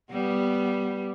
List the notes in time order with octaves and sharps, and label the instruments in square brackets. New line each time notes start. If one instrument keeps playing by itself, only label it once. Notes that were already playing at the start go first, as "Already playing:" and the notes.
[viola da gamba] G3 B3